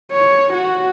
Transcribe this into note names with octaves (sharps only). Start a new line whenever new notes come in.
C#5
F#4